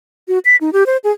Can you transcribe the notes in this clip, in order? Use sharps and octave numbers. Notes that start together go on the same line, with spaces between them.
F#4
B6
D#4
G4
C5
G#4